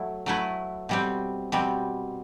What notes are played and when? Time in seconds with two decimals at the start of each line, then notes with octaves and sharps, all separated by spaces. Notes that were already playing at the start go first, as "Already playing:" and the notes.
Already playing: F#3 A3 E4
0.26 F#3 A3 E4 B4
0.89 B2 G3 C4
1.52 B2 G3 C4